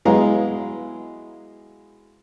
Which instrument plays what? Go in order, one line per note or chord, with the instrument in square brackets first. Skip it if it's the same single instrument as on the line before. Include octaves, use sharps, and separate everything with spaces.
[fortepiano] F#3 G#3 B3 E4 F5 A#5